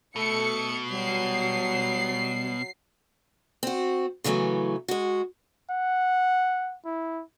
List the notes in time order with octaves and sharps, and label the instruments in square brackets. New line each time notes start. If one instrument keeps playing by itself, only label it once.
[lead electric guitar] B2 [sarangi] A3 [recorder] A4 [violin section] C#7
[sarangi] F#3 [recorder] G3 [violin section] C7
[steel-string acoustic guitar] C4 F#4
C#3 E3 F#3 A3 B3
G#3 F#4
[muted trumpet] F#5
E4